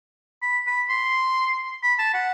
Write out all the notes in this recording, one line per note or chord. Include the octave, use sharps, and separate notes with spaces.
B5
B5
C6
B5
A5
F#5